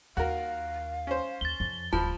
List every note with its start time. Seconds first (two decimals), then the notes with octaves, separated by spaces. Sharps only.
0.17 D#2 F#4 A#4 F5
1.07 C#4 C5
1.41 D#2 A6 G7
1.60 F2
1.93 D1 F3 G3 A5 B5